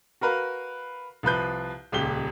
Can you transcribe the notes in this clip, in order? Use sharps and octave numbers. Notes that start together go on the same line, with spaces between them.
F#4 A#4 B4 F5
C2 F3 B4 G6
D#1 C#2 G4 G7